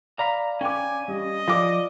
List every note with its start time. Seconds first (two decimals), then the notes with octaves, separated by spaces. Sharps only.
0.19 D5 F5 A#5 B5
0.61 C#4 G5 G#5 D6
1.08 G3 D#5
1.48 F3 F4 D5 D6 A#6